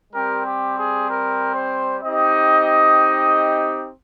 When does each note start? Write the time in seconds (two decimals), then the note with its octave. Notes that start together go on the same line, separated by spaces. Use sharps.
0.13 G3 C4 G4 A#4
0.45 G4
0.77 G#4
1.08 A#4
1.55 C5
2.02 C4 D#4 G4 D#5